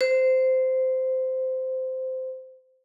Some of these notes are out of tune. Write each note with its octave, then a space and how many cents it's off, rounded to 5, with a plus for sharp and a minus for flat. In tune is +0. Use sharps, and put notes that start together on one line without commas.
C5 -15